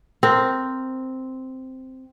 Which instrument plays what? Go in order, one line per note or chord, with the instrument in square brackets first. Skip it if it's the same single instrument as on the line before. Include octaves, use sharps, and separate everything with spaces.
[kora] C4 A#4